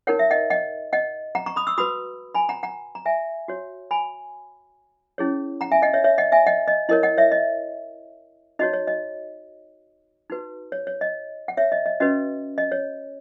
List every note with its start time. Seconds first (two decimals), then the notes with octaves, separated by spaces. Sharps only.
0.07 D#4 A#4 C#5 F#5
0.19 E5
0.31 D#5 F#5
0.50 D#5 F#5
0.93 D#5 F#5
1.35 F#5 A#5
1.46 A#5 C#6
1.56 B5 D#6
1.67 C#6 E6
1.78 F#4 B4 B5 D#6
2.35 G#5 B5
2.49 F#5 A#5
2.63 F#5 A#5
2.95 A#5
3.06 E5 G#5
3.48 F#4 C#5
3.91 G#5 B5
5.18 C#4 E4 G#4 C#5
5.61 F#5 A#5
5.71 E5 G#5
5.82 D#5 F#5
5.93 C#5 E5
6.04 C#5 E5
6.18 D#5 F#5
6.32 E5 G#5
6.47 D#5 F#5
6.68 D#5
6.89 E4 A#4 C#5 D#5
7.03 D#5 F#5
7.18 C#5 E5
7.32 D#5
8.59 D#4 F#4 C#5 D#5
8.73 C#5
8.87 D#5
10.30 D#4 F#4 B4
10.72 C#5
10.87 C#5
11.01 D#5
11.48 F#5
11.57 C#5 E5
11.72 D#5
11.86 D#5
12.00 C#4 F#4 B4 D#5
12.58 D#5
12.72 C#5